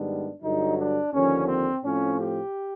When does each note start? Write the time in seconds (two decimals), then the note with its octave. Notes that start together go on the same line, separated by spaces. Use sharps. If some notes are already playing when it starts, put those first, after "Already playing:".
Already playing: G#2 D#3 G3 B3 D4
0.42 G2 D3 F#3 D#4
0.78 D4
1.13 D#2 D3 F3 C#4
1.48 C4
1.83 A2 F3 A3 C4 C#4
2.19 G4